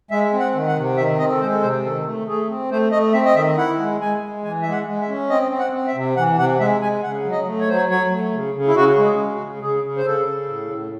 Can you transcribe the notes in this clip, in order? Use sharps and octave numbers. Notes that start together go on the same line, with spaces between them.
G#3 E5
C4
F#5
D#3
F#5
C3
D#3 E5
C4 D#5
A4
G#3 C5
A4
C3 C5
D#3 A4
A3
A3 G#4
C4
A3 C5
A3 D#5
C4 E5
D#5
D#3 E5
E4 F#5
G#3
G#3 G#5
G#3
E3 G#5
G#3 E5
F#5
G#3
E5
C#4
C4 D#5
C4
F#5
C4
E5
C3
E3 F#5
C3 F#5
G#3 E5
G#3 G#5
C#3 F#5
F#3
D#5
A3
C#5
F#3 C5
C#5
F#3 C#5
A3
C#3
C#3
E4
C#3 F#4
G#3
G#4
C#3
F#4
C#3
C#3 G#4
C#3
C5
C#3 A4
C#3
A2
A2